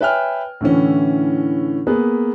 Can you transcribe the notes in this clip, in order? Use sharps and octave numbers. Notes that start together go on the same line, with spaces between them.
B4 C#5 E5 G5 G#5 F6
A2 D3 E3 C#4
A#3 B3 G#4 B4